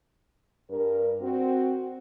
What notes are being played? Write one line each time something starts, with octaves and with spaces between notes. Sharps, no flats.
G2 A#4
C4 F#4